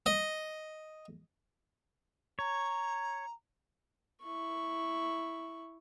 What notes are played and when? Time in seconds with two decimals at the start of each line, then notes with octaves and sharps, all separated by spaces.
0.06 D#5
2.39 C#5 A#5
4.23 E4 C#6